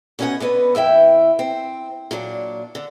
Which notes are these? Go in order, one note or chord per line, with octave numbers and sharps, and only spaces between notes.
B2 C#4 D#4 G#4 F#5 G#5
D3 B3 B4 D#5
F2 E4 E5 G5
C4
A#2 F#3 D4
D3